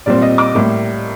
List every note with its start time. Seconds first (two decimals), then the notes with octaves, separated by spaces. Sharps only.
0.06 A#2 G3 C4 D5
0.22 D#5
0.38 D6
0.55 A2 G3 A#3